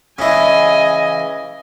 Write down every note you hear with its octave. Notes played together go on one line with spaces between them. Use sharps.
C#3 E3 D#5 G#5